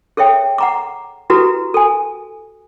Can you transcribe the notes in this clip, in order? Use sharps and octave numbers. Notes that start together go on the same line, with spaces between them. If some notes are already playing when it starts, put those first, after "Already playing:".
G#4 A4 C#5 E5 G5
F#5 A#5 D6
E4 F#4 G4 A4 B4 A#5
A4 G#5